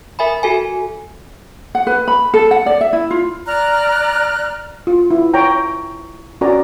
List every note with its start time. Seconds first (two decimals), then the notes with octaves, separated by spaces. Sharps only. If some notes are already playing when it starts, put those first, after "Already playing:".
0.19 A#4 E5 G#5 B5
0.43 F#4 A4 G#5
1.75 F#5
1.87 B4
2.08 B5
2.34 A4
2.51 F#5
2.66 D5
2.81 E5
2.93 E4
3.11 F4
3.47 D5 A#5 F6 F#6
4.87 F4
5.11 E4
5.33 C#5 F#5 G5 A#5
6.41 C#4 F#4 A#4 D5 G#5 A#5